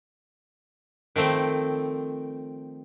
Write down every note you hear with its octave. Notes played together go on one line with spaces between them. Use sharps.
D#3 F3 A3 C4